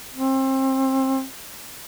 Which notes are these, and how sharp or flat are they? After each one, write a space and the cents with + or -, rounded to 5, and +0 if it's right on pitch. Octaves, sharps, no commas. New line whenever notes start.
C4 +30